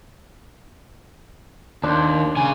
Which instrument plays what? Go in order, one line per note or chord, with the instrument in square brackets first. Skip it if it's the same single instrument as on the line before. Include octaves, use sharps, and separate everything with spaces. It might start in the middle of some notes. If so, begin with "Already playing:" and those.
[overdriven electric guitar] D#2 [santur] D4 C5
[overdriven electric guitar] C#3 G#5